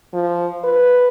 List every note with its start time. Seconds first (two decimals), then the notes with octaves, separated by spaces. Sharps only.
0.14 F3
0.64 B4